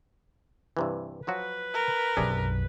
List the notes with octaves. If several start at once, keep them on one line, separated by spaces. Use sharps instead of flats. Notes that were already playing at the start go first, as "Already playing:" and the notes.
G2 C3 E3
F3 F#3 F#4 B4
A#4
B1 F#2 C3 D4 G#4